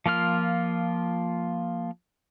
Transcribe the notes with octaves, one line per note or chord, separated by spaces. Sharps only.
F3 A#3 F4 F6